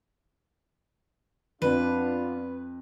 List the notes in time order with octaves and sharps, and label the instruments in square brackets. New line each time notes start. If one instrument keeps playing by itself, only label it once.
[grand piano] F2 [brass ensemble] B3 D4 F4 [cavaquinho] B4